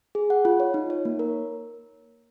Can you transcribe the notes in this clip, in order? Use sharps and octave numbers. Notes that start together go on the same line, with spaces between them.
G#4
F#5
F4
C#5
D#4
C#5
A#3
A#4